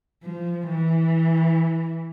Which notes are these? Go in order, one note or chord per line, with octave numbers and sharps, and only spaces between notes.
F3
E3